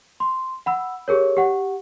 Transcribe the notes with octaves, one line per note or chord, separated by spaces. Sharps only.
C6
F#5 B5 E6
G4 G#4 A#4 C#5
G4 F#5